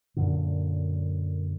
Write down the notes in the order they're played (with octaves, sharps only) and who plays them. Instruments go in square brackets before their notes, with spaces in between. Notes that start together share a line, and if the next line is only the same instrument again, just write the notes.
[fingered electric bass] F#2 A#2 D3